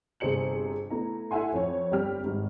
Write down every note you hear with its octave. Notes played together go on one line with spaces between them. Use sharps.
G1 C3 G#4 C5 C#7 F#7
A3 B3 E4 A#5
E4 A4 E5 F#5 G#5 C6
F2 C#5
G1 G3 C4 G4 F6
G#1 G2